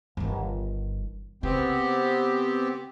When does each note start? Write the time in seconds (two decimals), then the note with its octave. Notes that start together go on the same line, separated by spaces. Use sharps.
0.17 G1 D#3
1.43 C#3 B3 C4 G4